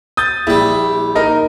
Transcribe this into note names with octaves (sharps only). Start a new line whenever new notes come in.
D#6 G6 A6
A#1 G3 E4
D#4 A#4 D#5